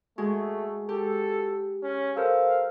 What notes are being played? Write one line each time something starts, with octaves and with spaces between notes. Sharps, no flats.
G#3 A3 F#4
G4 A4
C#4
A4 A#4 C5 F5